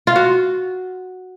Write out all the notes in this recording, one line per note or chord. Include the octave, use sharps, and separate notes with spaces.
F4
F#4